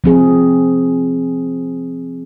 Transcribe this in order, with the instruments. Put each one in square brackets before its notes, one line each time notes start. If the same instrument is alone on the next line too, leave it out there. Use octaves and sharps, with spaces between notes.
[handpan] F3 C4 G#4